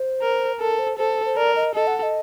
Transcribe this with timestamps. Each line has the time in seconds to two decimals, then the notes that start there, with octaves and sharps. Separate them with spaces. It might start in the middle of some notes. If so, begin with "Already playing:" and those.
Already playing: C5
0.22 A#4
0.60 A4 A#4
0.79 C5
0.98 A4 C5
1.25 C5
1.37 A#4 D5
1.56 D#5
1.75 A4 D#5
1.87 F#5
1.98 F#5
2.03 D#5